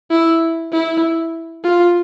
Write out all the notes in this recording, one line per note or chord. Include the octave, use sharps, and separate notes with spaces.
E4
E4
F4